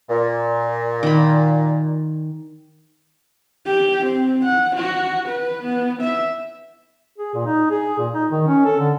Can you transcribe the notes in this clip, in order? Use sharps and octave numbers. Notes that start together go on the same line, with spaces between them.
A#2
D#3 B5
G4
C4
F#5
F#4
B4
B3
E5
G#4
A#2
D#4
G#4
A#2
D#4
D#3
C#4
A4
D3